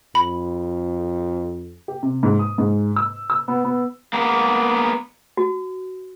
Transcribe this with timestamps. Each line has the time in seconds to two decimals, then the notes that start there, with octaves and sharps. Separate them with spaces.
0.15 F2 B5
1.88 G4
2.03 C3
2.23 G#2
2.39 D#6
2.58 G#2
2.96 E6
3.30 E6
3.48 B3
3.64 B3
4.13 A#3 B3
5.37 F#4